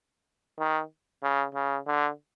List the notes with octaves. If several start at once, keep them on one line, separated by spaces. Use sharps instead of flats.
D#3
C#3
C#3
D3